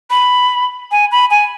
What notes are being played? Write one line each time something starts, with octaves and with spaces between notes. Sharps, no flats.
B5
G#5
B5
G#5